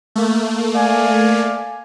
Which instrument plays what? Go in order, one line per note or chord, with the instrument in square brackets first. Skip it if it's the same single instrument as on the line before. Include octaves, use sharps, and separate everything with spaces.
[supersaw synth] A3 A#3
[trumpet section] D5 F5 G#5